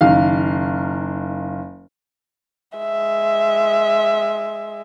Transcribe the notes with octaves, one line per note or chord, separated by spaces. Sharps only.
F#1 D#3 F5
G#3 E5